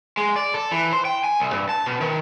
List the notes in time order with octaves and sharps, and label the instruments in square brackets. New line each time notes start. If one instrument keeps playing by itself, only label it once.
[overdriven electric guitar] G#3
D5
A4
E3
C5
G5
G#5
C2
G2
A5
B2
D#3